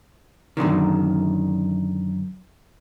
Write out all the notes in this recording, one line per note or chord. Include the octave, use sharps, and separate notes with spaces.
F#2 A2 D3 D#3